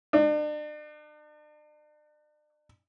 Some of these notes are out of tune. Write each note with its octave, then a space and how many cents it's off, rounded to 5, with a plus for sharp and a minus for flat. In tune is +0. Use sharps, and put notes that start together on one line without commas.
D4 +40